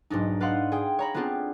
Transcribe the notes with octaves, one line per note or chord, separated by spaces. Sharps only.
B1 G#2 D4 D#4
B4 D5 F5 F#5 C6 D#6
G#4 G5 D#6
C#5 A#5 B5
B3 C4 D4 F4 G4 G#4